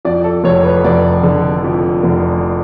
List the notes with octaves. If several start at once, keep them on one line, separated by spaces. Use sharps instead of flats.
F2 D5
A4
F1 C#5
B4
F1 D5
D3
F2
F1